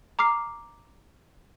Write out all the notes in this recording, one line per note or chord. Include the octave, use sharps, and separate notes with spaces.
A#5 D6 F6 C7